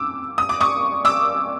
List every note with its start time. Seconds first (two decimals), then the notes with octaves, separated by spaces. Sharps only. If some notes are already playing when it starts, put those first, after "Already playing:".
Already playing: D6 E6
0.38 D#6
0.49 D6
0.61 C#6 D#6
1.05 D6 E6